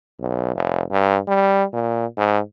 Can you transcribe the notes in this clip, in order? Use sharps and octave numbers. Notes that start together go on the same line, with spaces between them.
B1
F1
G2
G3
A#2
G#2